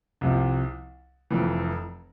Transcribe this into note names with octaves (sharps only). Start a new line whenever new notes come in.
C2 C3 F3
F1 F2 E3